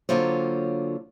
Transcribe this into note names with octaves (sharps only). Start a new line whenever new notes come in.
D3 F#3 A#3 F4 C5 C#5